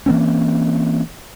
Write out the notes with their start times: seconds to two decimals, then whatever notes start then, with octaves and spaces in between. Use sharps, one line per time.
0.06 E3 A#3 C4 C#4